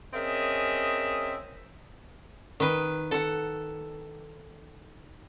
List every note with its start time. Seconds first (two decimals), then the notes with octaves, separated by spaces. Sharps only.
0.14 C4 C#4 G#4 A#4 D#5 E5
2.60 D#3 B4
3.11 A4 F#5